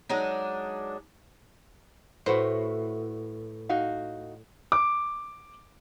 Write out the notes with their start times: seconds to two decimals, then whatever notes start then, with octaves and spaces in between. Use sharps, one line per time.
0.09 F#3 G#3 D4 D#4
2.26 A2 F#4 B4 C5
3.69 D#4 F#4 F5
4.72 D6